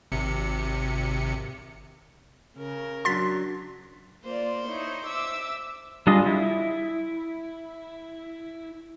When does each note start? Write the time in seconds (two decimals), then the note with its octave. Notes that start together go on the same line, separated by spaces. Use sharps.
0.12 G#1 C3 C#7
2.57 C#3 A#4
3.05 F#3 D4 C6 A6 B6
4.24 A#3 F4 C5 D5
4.66 D#4 E4 C#5
5.06 E5 D6 E6
6.07 G3 D4 F4 G#4 D#5
6.25 E4